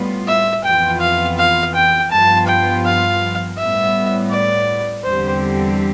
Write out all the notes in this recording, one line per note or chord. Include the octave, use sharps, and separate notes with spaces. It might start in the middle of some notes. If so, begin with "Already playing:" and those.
Already playing: A2 G3 B3 F4
E5
F2 E3 B3 F4 G5
F5
F5
G5
G2 F3 B3 F4 A5
G5
F5
A2 G3 B3 E5
D5
E2 D3 G3 C4 G4 C5